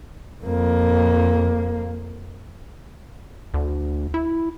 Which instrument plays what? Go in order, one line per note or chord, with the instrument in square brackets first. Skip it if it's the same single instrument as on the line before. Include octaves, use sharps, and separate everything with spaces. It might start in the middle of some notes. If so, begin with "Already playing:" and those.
[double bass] F2 A#3
[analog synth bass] D2
E4